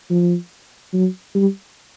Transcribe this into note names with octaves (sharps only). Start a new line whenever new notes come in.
F3
F#3
G3